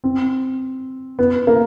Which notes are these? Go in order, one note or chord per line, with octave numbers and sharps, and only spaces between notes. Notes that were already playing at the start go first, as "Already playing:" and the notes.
C4
B3
A#3